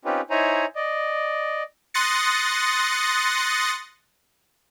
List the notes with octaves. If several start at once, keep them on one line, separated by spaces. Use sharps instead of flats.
C4 C#4 D#4 F4 G4 B4
D#4 E4 C5 C#5 G#5 A#5
D5 D#5
C6 D#6 F#6 A6 A#6 C#7